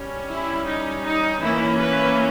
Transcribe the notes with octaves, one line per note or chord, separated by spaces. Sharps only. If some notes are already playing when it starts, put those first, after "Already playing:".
Already playing: G3 C#4
E4
D#4
D#4
E3 A#3 C#4 E4
B4